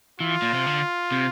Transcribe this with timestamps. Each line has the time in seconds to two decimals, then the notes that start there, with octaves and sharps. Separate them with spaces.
0.20 E3 F4
0.42 A#2
0.54 C3
0.66 D3
1.12 C3